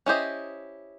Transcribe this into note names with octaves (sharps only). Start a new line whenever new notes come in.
C#4 E4 G4 C5 D#5